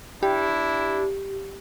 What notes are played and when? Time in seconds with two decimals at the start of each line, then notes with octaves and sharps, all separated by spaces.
0.23 D4 E4 G4